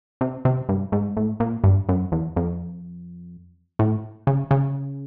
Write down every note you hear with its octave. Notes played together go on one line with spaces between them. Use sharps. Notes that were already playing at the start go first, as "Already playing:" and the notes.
C3
C3
G2
G#2
A2
A#2
G2
F#2
E2
F2
A2
C#3
C#3